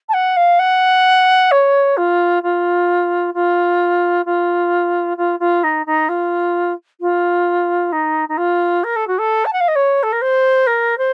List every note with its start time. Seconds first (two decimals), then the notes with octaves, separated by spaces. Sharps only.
0.09 A5
0.14 F#5
0.37 F5
0.59 F#5
1.51 C#5
1.97 F4
2.43 F4
3.34 F4
4.26 F4
5.17 F4
5.40 F4
5.64 D#4
5.86 D#4
6.09 F4
7.01 F4
7.92 D#4
8.29 D#4
8.37 F4
8.84 A#4
8.96 A4
9.07 F#4
9.19 A4
9.45 A5
9.53 F#5
9.60 F5
9.68 D#5
9.76 C#5
10.03 A4
10.12 A#4
10.22 C5
10.67 A#4
10.98 C5